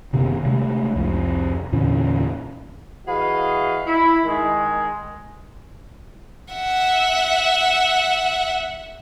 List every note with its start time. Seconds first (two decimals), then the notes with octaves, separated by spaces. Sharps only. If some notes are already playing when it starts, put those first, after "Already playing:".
0.13 F#1 C3 D#3 B3
0.45 C3 G#3 A3
0.96 C2 F2 C3
1.72 E2 A#2 D3 C#4
3.06 E3 F#4 G#4 B4 D#5 F5
3.86 E4
4.25 D#3 G#3
6.53 E5 F#5